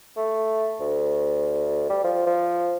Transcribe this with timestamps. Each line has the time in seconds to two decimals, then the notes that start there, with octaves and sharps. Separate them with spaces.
0.17 A3
0.80 D2
1.90 G3
2.04 F3
2.27 F3